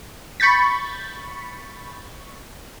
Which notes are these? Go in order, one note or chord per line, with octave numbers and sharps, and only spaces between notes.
B5 C#6 G6 A6 B6